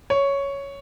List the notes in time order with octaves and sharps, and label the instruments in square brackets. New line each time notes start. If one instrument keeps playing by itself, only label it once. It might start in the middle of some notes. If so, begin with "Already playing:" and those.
[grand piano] C#5